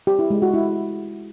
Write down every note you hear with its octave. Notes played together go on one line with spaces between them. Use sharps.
G4
E4
G#3
F#4
E4